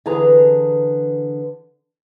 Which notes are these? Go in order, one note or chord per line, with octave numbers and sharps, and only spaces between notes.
D3 E3 G#4 B4 A#5